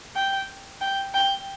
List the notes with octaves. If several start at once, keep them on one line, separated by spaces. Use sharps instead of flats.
G5
G5
G5